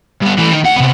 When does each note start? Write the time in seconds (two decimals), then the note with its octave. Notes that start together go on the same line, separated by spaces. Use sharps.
0.22 G2 B3
0.38 E3 A3
0.52 D#3 D#4
0.64 D2 F#5
0.76 C3 B3